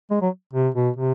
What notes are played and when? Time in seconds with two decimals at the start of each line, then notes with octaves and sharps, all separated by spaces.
0.11 G#3
0.22 F#3
0.54 C3
0.75 B2
0.96 C3